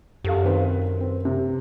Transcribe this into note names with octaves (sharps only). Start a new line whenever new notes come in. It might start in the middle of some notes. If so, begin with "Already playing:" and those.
F#2 G4 A4 F5
D#3 C4 B4
C4
C3